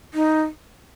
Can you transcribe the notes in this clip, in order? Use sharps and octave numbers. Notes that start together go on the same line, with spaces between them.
D#4